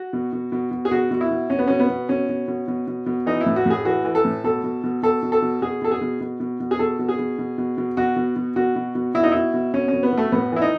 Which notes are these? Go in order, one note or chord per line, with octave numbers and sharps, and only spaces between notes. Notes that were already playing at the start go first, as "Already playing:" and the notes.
Already playing: F#4
B2
B2
B2
B2
G#4
B2 F#4
B2 F#4
E4
B2
B2 C#4
B3
B2 C#4
B3
B2
B2 C#4
B2
B2
B2
B2
B2
E3 D#4
E4
A2
F#4
A2 G#4
E3 F#4
E3
A4
A2
B2 A4
B2
B2
B2 A4
B2
A4
B2
B2 G#4
B2 A4
G#4
B2
B2
B2
B2
G#4
B2 A4
B2
G#4
B2
B2
B2
B2
B2 F#4
B2
B2
B2 F#4
B2
B2
B2 E4
D#4
B2 E4
B2
B2 C#4
C#4
B2
B3
B2
A3
A2 B3
E3 E4
D#4